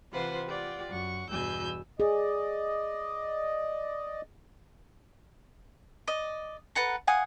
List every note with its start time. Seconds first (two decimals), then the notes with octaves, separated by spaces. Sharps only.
0.12 C3 E3 F4 B4 C5 F#5
0.48 F4 G4 D5 F#5 G5
0.89 F#2 F#5 C#6
1.30 E2 G2 B2 G#5 E6 G6
2.00 G#4 D5 D#5
6.07 D5 D#5
6.75 A4 B4 F#5 A#5
7.07 F5 F#5 G#5 D#6